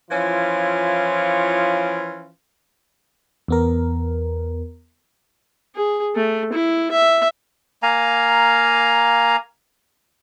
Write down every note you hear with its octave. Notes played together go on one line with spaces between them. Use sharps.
E3 F3 C#4 E4 F4
E2 B3 A#4
G#4
A3
E4
E5
A#3 F5 G#5 A#5